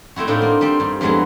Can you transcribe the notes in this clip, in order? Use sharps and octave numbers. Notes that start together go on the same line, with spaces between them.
A3 C4 E4 F#4
A2 D4 D#4 F4
A#3
G3 C4
G2
F2 E3 F#3 G#3 B3